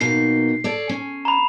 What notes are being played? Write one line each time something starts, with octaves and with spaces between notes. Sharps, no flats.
B2 A#3 D#4 C7
A4 C#5 D5
C#4
A#5 B5